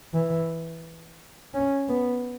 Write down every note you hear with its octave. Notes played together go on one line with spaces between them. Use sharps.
E3
C#4
B3